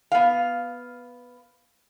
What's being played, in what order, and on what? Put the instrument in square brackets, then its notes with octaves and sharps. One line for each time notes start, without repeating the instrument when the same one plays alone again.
[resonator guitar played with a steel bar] B3 F5